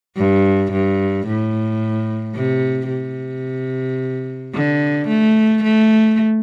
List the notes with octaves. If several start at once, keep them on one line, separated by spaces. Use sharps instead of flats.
G2
G2
A2
C3
C3
D3
A3
A3